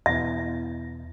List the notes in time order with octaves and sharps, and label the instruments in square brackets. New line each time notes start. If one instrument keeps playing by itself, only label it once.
[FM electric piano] E2 B2 B3 E4 [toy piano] E5